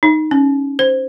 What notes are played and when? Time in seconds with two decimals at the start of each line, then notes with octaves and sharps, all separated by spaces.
0.03 D#4
0.31 C#4
0.79 C5